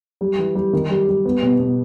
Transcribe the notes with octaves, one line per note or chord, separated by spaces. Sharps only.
G3
E3
G3
D#3
G3
G3
B3
B2
B2